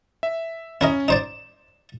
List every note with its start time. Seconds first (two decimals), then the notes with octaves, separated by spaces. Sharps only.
0.23 E5
0.81 C#4 E4 A#4 D#5
1.08 D#4 C5 D5 E7